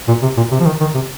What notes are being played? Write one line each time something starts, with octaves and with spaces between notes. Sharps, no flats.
A#2
C3
A#2
C3
F3
D#3
D#3
C3